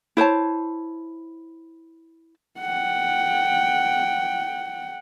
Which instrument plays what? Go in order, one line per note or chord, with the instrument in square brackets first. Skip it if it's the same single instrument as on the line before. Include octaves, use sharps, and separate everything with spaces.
[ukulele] E4 C5 C#5 A5
[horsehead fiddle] F#5 G5